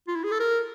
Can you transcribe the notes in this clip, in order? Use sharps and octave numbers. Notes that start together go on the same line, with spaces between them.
F4
E4
G#4
A4
A#4